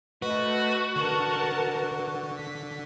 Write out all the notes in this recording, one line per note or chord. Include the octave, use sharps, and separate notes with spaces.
A3 F#4 B4 D#5
D3 A#4 B4 A5
B6